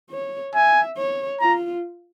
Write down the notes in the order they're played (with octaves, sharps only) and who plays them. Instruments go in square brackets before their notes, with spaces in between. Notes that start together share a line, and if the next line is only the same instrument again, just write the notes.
[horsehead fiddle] C#5
[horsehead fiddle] E5 [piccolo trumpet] G#5
[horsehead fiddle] C#5
[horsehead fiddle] F4 [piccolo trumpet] A#5